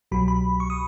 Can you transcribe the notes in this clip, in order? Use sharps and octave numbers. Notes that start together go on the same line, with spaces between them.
C2 B2 F#3 B5
B5
C#6
D#6